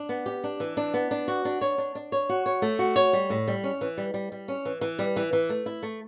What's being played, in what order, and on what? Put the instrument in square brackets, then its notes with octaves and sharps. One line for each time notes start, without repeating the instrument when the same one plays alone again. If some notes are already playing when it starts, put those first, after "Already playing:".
Already playing: [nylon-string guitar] D4
B3
G4
D4
E3
D4
B3
D4
F#4
D4
C#5
D4
D4
C#5
F#4
C#5
A3
F#4
C#5
G3
A2
G3
C#4
E3
G3
G3
G3
C#4
E3
E3
G3
E3
E3
A3
E4
A3